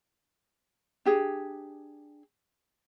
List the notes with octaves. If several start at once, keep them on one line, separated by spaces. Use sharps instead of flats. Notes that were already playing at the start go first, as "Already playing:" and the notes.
D4 G4 G#4